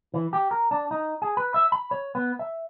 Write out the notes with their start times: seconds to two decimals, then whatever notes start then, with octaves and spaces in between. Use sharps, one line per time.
0.14 E3
0.33 G4
0.51 A#4
0.71 D4
0.91 D#4
1.22 G#4
1.37 B4
1.54 E5
1.72 B5
1.91 C#5
2.15 B3
2.39 E5